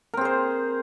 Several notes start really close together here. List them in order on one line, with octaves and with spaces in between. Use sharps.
A#4 C4 G#4 C5